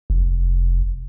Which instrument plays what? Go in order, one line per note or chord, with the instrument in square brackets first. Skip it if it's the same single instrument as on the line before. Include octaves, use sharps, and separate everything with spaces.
[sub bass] F1